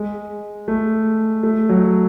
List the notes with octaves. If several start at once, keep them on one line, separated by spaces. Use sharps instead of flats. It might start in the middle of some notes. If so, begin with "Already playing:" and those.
Already playing: G#3
A3
A3
F#3